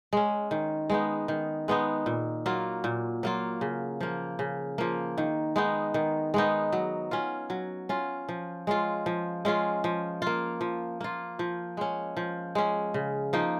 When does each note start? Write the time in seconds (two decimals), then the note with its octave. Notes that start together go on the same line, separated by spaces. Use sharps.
0.13 G#3 C#4
0.51 D#3
0.90 G#3 B3 D#4
1.28 D#3
1.68 G#3 B3 D#4
2.06 A#2
2.46 F#3 A#3 F4
2.84 A#2
3.23 F#3 A#3 F4
3.61 C#3
4.01 F3 A#3
4.39 C#3
4.78 F3 A#3
5.18 D#3
5.56 G#3 B3 D#4
5.94 D#3
6.34 G#3 B3 D#4
6.73 F#3
7.11 C#4 F4
7.50 F#3
7.89 C#4 F4
8.29 F3
8.67 G#3 C#4 F4
9.06 F3
9.45 G#3 C#4 F4
9.84 F3
10.22 A#3 F4
10.61 F3
11.01 A#3 F4
11.39 F3
11.77 G#3 C#4
12.17 F3
12.55 G#3 C#4
12.94 C#3
13.33 F3 A#3 D#4